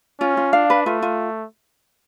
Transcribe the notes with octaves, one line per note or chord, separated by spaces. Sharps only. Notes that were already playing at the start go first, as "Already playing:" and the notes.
C#4 F4
F4
D4 F5
B4
A3 F4
F4